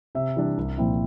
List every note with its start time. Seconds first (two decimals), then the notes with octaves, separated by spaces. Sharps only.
0.15 C3 E5
0.36 E3 G3 D4
0.57 C2
0.78 A#2 F3 C4 E4